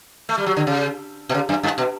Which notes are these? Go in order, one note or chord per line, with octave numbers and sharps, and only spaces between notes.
A3
G3
F#3
D3
C#3
B2
C#3
F#2
G2
B2